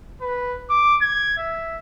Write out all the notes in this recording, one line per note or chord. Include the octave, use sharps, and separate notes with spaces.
B4
D6
G#6
E5